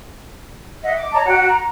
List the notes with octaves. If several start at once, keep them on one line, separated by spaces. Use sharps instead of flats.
D#5 E5 F#5
D6
C#5 D#5 A5 A#5
F#4 F#5 G5
A#5